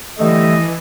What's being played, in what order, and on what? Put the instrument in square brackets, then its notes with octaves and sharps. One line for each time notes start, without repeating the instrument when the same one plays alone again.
[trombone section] D3 G3 A3 [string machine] E3 [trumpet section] D#5